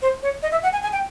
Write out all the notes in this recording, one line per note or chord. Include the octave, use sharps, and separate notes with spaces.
C5
C#5
D#5
E5
F#5
G#5
G#5
G5